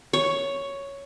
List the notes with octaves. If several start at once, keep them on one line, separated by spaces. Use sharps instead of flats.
C#5